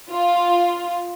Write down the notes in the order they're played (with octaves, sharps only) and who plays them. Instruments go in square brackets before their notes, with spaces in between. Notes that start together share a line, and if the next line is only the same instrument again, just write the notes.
[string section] F4